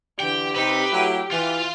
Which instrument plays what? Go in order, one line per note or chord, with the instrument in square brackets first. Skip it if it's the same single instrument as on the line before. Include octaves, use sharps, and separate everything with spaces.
[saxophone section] D3 E3 [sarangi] G4 [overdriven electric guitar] G5
[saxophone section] C3 C4 D#4 [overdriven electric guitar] B4
[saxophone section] F#3 A3 E4
[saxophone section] E3 [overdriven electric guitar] F4 F5